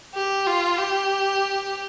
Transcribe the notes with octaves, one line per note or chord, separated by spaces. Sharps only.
G4
F4
G4